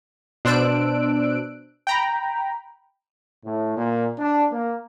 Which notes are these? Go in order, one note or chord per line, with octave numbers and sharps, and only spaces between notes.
B2 D4 C5 E6 F#6 D7
G5 A#5 B5
A2
A#2
D4
A#3